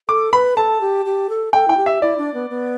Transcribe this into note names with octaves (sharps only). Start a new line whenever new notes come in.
A4 D6
B4 B5
A4 A5
G4
G4
A4
A4 G5
E4 G5
G4
E5
E4 D5
D4
B3
B3